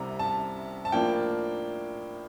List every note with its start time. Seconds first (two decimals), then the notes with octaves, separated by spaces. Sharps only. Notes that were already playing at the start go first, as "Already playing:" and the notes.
Already playing: C2 C3 G3 A#5
0.19 A5
0.85 A5
0.92 A2 F3 A#3 D4 G5